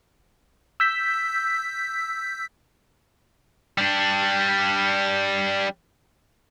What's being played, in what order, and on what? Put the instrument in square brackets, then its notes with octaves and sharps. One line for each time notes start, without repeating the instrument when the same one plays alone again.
[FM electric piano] E6 G6 B6
[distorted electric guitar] G3 D4